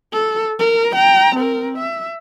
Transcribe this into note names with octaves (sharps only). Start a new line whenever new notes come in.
A4
A#4
G5 A#5
C4 A#4
E5